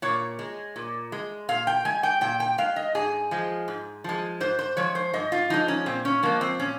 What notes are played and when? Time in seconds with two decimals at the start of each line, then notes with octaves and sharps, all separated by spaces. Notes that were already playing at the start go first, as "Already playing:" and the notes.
0.02 A#2 C#5
0.39 G#3
0.76 A#2
1.12 G#3
1.49 A#2 F5
1.67 G5
1.85 G#3 G#5
2.03 G5
2.21 A#2 G5
2.40 G5
2.58 G#3 F5
2.76 D#5
2.95 G#2 G#4
3.31 F3 G#3
3.68 G#2
4.04 F3 G#3
4.40 G#2 C5
4.59 C5
4.77 F3 G#3 C#5
4.95 C5
5.13 G#2 D#5
5.32 F4
5.50 F3 G#3 D#4
5.68 C#4
5.86 A#2 C4
6.05 C#4
6.23 F3 G#3 A#3
6.41 C4
6.59 A#2 C#4